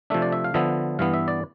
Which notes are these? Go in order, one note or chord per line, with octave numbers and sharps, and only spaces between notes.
C3 F3 A3 D4 E5
D5
E5
F5
D3 F3 B3 E5
G2 E3 B3 F5
E5
D5